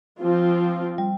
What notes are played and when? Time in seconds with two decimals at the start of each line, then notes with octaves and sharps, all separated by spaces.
0.20 F3 C4 F4
0.98 G3